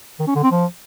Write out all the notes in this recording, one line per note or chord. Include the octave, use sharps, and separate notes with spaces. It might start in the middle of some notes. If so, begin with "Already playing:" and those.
D#3
C#4
D3
C4
F3